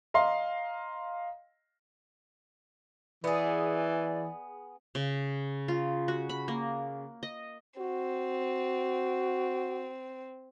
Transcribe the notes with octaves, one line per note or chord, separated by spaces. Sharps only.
D#5 F5 A#5 C6
E3 B3 G#4 D5
C#3
F4
F#4
B5
A#3
D#5
C4 F#4